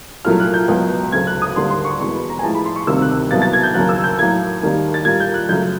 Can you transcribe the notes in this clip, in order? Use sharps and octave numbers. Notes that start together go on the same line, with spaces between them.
C2 A#2 F#3 A3 F6
F#6
G6
C#2 B2 F#3 A#3
D2 C#3 F#3 A3 G#6
F#6
D#6
D#2 D3 G3 A#3 C6
C6
C#6
E2 B2 G#3 C#6
B5
A#5
G#5
A2 F3 G#3 A5
B5
C6
C#6
D2 C3 D#3 G3 A#3 E6
F#6
C2 B2 F#3 A#3 A6
A6
G#6
G6
D#2 C#3 F#3 A#3 F#6
E6
G6
A2 F#3 A#3 G#6
D#2 D#3 G3 A#3
A6
A#2 G3 A#3 G#6
G6
F#6
F#2 C#3 F#3 A3 G6